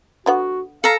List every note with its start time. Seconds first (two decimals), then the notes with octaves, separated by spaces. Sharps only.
0.26 D3 B3 F#4 F#5
0.84 A4 F5 A#5